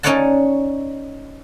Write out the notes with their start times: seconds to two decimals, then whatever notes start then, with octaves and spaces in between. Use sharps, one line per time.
0.03 C#4 D#4 C#5 D5 F#5 A5